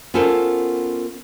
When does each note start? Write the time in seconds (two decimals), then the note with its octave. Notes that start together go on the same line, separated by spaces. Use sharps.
0.14 B3 C#4 F4 A4 A#4 C5